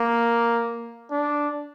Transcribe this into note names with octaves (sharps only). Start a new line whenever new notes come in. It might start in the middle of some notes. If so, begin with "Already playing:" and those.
Already playing: A#3
D4